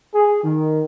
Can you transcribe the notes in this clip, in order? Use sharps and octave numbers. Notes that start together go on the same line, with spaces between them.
G#4
D#3